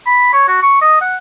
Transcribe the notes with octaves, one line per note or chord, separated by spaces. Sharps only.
B5
C#5
F#4
C#6
D#5
F#5